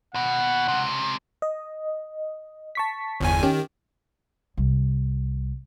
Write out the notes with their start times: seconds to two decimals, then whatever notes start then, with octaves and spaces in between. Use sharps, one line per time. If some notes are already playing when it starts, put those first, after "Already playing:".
0.14 D#2 B2 F#5
0.68 C#2 C3
1.42 D#5
2.75 A5 C#6 B6
3.20 G1 E2 G#5
3.43 D#3 C#4 G4
4.57 C2